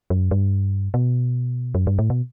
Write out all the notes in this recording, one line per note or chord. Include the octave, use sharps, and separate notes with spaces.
F#2
G2
B2
F#2
G2
A2
B2